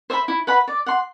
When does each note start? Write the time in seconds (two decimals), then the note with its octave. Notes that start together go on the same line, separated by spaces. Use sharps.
0.10 C5 E5 B5
0.28 E4
0.47 B4 F#5 B5
0.68 D5
0.86 F#5 C6